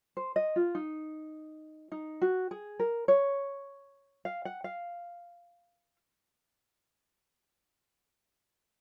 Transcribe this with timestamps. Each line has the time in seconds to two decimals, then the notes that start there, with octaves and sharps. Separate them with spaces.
0.17 C5
0.36 D#5
0.56 F4
0.75 D#4
1.92 D#4
2.22 F#4
2.51 G#4
2.80 A#4
3.08 C#5
4.25 F5
4.45 F#5
4.64 F5